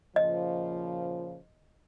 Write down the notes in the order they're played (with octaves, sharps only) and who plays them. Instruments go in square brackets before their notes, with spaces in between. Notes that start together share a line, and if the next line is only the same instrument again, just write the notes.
[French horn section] A#2 C#3 F3 [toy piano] D#5